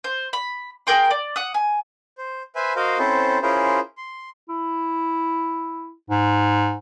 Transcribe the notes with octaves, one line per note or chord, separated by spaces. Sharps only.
C5
B5
G#4 A#4 G5 C6
D5
F#5 D#6
G#5
C5
B4 C5 E5 G#5 B5
F#4 A#4 C5 D#5 F5
C4 C#4 E4 A4 C5
C#4 E4 F4 G#4 A#4 C5
C6
E4
G#2